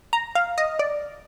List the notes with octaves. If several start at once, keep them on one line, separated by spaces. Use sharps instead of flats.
A#5
F5
D#5
D5